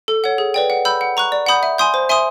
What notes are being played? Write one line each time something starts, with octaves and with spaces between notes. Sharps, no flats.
A4
C#5 F#5
G#4
B4 D5 G5
F#5
B5 E6 G6
F#5
A#5 C#6 F#6
D5
F#5 B5 D#6 G6
E5
G#5 C6 D#6 G6
C5
E5 G#5 C6 D#6